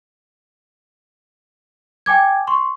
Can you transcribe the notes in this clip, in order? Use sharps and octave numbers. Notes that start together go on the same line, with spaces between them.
G5 G#5 D6 G#6
C6 C#6